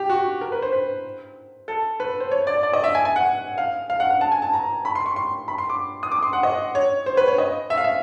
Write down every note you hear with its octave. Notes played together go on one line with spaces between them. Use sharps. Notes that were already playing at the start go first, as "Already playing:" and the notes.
Already playing: G4
F#4
A#4
B4
C5
B4
A4
B4
C5
C#5
D5
D5
D#5
E5
G#5
G#5
F#5
F5
F5
F#5
F#5
A5
G#5
A5
A#5
B5
C6
C#6
C6
B5
C6
D6
D#6
D6
C6
F#5
D#5
C#5
C5
B4
C#5
D#5
E5
F5
E5